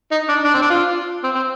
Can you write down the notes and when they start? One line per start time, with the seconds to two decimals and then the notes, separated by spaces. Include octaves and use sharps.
0.11 D#4
0.29 D4
0.45 D4
0.54 C4
0.62 D4
0.70 F4
1.24 C4
1.35 C4